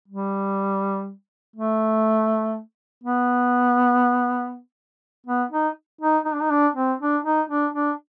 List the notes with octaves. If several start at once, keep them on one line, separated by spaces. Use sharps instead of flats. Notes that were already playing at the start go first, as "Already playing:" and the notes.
G3
A3
B3
B3
D#4
D#4
D#4
D4
D#4
D4
C4
D4
D#4
D4
D4